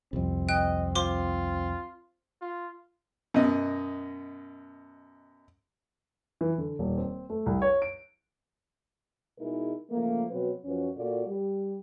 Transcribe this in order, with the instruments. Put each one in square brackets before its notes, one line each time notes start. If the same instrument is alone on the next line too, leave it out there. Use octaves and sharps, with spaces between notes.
[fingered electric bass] C2 F2 [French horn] C4
[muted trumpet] D#5 [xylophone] G5 F#6
[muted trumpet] F4 [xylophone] C5 C6 D6
[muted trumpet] F4
[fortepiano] F#2 B2 D#5
[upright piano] E3
D3
D#1
C4
A3
C2
C#5
D7
[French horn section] B2 G#3 D#4 E4 G#4 A#4
C#3 F3 A3 A#3
B2 F#3 C4 B4
F#2 F3 C#4 F#4 B4
A#2 A#3 F4 F#4 A4 D5
G3